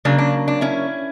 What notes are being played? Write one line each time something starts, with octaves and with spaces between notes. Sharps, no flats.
C#3 F#3 A#3 D4
D4
D4
C#4 E4